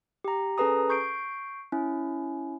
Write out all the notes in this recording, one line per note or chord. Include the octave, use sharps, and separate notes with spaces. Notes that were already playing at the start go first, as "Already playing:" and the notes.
G4 A#5
C#4 G#4 A4 B4 A#5 D#6
C#6 G6 C7 D7
C#4 E4